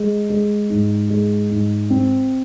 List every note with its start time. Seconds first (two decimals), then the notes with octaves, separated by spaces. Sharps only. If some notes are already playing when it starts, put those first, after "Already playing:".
Already playing: G#3
0.30 G#3
0.70 G#2
1.10 G#3
1.51 G#2
1.90 C4